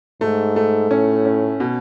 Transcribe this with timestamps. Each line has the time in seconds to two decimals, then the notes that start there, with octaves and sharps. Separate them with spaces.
0.21 G#2 A3
0.56 A3
0.90 A2 C#4
1.25 C#4
1.60 B2